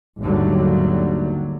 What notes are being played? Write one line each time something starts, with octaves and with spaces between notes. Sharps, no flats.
G#1 D#2 D3 F#3 G3 A3